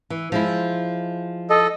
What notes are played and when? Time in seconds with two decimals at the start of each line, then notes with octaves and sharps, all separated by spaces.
0.10 E3
0.32 F3 G#3 E4
1.50 A4 D#5